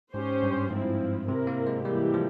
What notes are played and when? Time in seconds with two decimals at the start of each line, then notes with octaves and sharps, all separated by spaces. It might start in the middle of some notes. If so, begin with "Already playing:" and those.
0.14 G#2 C#4 G4 C5
0.43 G2
0.71 G#2 F3 C4 E4
1.28 C3 C4 E4 A#4
1.47 A#3
1.67 G#3
1.85 E3 G3 A#3 E4 G4
2.14 F3